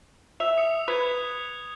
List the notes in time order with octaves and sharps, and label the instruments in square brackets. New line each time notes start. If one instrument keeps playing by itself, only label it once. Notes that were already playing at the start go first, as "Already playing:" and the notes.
[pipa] E5 [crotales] F7
[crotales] D#6 C#7
[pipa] B4 [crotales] F#6 G#6 F7